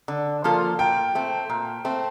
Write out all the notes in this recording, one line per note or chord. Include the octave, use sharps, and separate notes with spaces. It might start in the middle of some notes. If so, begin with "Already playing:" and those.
D3
F3 A#3 F4 A4
A#2 G5
A3 C4
A#2
A3 C4